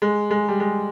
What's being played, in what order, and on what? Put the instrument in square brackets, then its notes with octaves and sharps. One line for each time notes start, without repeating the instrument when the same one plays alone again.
[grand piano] G#3
G#3
G3
G#3